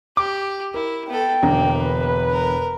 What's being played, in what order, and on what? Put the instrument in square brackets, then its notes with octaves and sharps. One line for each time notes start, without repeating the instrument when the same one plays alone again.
[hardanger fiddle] G4 [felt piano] D6
[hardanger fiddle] E4 [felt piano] A#4
[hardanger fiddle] B3 A4 [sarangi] G5
[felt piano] E1 D3 A#5 [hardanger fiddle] A#3
[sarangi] B4
[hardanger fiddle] A#4